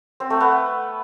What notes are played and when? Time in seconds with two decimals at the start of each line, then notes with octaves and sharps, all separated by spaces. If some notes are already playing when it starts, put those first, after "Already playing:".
0.20 C4
0.30 A3
0.40 B3